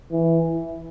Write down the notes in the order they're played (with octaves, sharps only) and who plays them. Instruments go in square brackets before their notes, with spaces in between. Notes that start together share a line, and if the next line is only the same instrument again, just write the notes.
[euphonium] E3